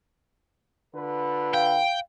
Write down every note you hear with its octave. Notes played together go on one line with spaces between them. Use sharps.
D3 F4 B4
F5 G5